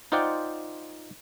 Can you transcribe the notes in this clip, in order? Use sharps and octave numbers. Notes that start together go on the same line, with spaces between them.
D#4 F4 C5 D5 F#5 G5